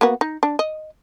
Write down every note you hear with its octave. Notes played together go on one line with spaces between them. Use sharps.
A#3 B3 F#4
D#4
D4
D#5